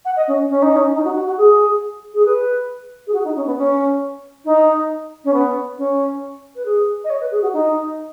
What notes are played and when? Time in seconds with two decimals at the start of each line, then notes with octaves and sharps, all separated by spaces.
0.04 F#5
0.16 D#5
0.27 C#4
0.49 C#4
0.62 D#4
0.75 C#4
0.93 D#4
1.04 F#4
1.15 F#4
1.26 F#4
1.37 G#4
2.13 G#4
2.25 B4
3.06 G#4
3.13 F#4
3.24 D#4
3.35 C#4
3.45 B3
3.57 C#4
4.45 D#4
5.24 C#4
5.33 B3
5.77 C#4
6.55 B4
6.65 G#4
7.04 D#5
7.09 C#5
7.20 B4
7.31 G#4
7.41 F#4
7.53 D#4